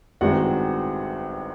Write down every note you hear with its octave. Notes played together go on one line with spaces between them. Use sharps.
A1 G2 D#3 G#3 C4 F#4 F#5